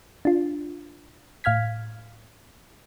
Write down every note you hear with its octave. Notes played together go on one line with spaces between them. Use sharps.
D4 F4
A2 F5 F6 G#6 B6